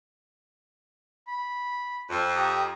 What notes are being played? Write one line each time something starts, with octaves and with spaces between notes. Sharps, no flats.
B5
F2
G4 A#5 D#6